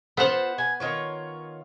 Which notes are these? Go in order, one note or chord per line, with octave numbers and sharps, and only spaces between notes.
B3 F4 C5 F#5
G#5
D#3 F4 C#5